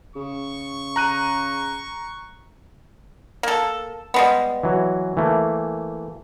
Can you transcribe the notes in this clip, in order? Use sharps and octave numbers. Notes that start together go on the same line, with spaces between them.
C#3 C#6
A#5 F#6 D#7
A#3 A4
G3 G#3 B3
E3 F#3
E3 A3 A#3